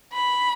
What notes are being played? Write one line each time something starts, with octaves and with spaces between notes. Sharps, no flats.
B5